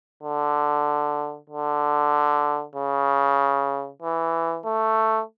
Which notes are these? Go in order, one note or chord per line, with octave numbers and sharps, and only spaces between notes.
D3
D3
C#3
E3
A3